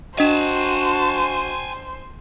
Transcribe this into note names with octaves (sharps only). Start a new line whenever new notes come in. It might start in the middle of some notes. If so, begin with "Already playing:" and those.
D4 F#4 C5 D#5 G#5 A5